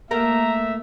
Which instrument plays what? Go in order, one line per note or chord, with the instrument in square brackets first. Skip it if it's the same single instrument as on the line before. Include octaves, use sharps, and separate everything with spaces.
[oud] A3 A#4 [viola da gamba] A#3 [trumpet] E5 [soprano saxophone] A#5